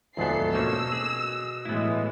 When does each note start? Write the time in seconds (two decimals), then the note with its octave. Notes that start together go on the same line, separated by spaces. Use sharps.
0.17 E1 D2 G#2 F3 B3 A4 C7
0.54 B2 A3 A#3 C#4 E6
0.92 G#4
1.65 A2 E3 G#3 B3 E4